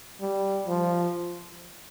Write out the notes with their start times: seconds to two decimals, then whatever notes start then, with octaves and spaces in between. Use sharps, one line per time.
0.21 G3
0.67 F3